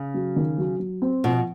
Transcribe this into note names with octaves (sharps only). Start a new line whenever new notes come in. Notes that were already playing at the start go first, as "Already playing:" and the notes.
Already playing: C#3
F#3
D#3
F#3
F#3
C4
B2 F3